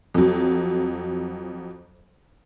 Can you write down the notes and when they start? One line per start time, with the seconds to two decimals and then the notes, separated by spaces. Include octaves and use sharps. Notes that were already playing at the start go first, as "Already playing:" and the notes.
0.14 F2 F#3